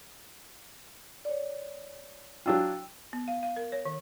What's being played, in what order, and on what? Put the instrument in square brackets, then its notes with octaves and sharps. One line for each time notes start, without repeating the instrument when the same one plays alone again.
[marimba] C#5 D5
[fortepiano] F#3 D4 F4 [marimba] G5 E6
[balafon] B3
F5
F5
A#4
C#5
D#3